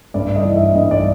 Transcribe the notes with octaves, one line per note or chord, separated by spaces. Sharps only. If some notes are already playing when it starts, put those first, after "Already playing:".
G2 D5
D#5
E3
E5
G2 D#5
D5